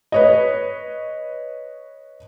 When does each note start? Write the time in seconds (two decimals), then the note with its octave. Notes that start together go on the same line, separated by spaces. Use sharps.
0.12 B4 C#5 D#5